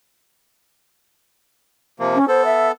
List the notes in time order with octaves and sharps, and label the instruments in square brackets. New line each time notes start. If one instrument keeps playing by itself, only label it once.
[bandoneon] C3 F3 A#3
[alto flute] C#4
[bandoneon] B3 A4 [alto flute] C5
[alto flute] E5